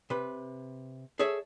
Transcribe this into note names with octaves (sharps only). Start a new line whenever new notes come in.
C3 B4
G#4 A4 C#5 E5